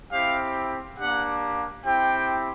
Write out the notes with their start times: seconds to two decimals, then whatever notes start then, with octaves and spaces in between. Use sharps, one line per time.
0.12 C4 E4 G4 F5
0.98 A#3 D4 G4 F#5
1.84 C4 E4 G4 G5